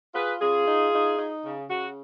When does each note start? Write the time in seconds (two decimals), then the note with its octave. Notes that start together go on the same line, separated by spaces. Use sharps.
0.14 F4 G#4 B4
0.40 C#3 F4 G#4
0.67 D#4
0.93 D#4
1.18 D#4
1.45 C#3
1.70 C#3 F#4